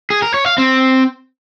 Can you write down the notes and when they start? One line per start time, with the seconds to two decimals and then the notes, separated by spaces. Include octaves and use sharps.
0.10 G#4
0.22 A#4
0.34 C#5
0.46 F5
0.58 C4